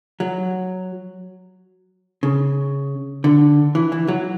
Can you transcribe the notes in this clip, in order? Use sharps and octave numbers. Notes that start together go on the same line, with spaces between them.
F#3
C#3
D3
E3
E3
F#3